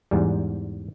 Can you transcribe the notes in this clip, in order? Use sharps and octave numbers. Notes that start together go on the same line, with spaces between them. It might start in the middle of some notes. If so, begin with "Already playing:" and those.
E2 G#2 G3